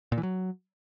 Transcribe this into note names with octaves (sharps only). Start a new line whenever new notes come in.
A#2
E3
F#3